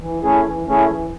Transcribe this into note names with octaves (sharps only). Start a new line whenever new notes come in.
E3
A3 C#4 E4 G#4
E3
A3 C#4 E4 G#4
E3